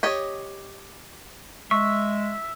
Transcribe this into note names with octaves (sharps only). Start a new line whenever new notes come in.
G4 C#5 D#5
G#3 E5 C#6